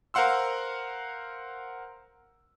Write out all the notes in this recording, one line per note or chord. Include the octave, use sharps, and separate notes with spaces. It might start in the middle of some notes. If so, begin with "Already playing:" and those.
A#4 C5 F5 F#5 C6 E6